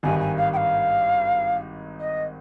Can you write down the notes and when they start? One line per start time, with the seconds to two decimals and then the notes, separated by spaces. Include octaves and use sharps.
0.03 G#1 G2 D#3 G#5
0.20 G#5
0.37 F5
0.53 G5
0.56 F5
2.00 D#5